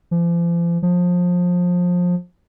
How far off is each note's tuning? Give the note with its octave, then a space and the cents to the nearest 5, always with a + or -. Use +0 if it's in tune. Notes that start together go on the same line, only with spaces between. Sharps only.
F3 -40
F3 +25